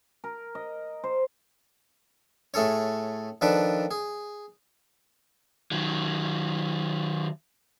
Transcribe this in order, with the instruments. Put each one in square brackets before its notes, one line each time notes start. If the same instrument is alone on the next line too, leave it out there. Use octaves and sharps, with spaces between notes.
[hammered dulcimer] A#4
D#5
C5
[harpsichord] A2 A3 G#4 A4 C#5
D#3 F3 D4 A4 B4 D5
G#4
[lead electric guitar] D#3 F#3